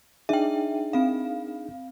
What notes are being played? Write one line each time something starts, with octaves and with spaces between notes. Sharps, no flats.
D4 D#4 G#4 E5 G5
C4 F5